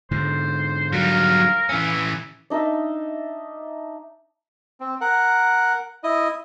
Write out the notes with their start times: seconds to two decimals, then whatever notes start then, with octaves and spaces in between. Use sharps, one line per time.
0.11 G#2 D3 C5
0.93 F#3 G3 A#4 F5
1.69 E3 C#4 E4
2.50 D4 D#4 D#5 E5
4.80 C4
5.01 A#4 F#5
6.04 E4 D#5